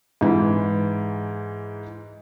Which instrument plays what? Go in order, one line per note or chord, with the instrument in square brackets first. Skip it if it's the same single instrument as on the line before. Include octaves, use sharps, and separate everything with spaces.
[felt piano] G#2 E3